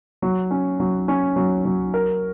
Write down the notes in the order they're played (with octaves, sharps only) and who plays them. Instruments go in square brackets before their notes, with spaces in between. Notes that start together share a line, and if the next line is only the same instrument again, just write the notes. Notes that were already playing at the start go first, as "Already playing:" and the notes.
[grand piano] F#3
C#4
F#3
C#4
F#3
F#3
A#4